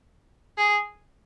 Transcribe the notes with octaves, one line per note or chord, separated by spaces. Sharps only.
G#4